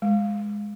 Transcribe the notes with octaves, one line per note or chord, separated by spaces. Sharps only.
G#3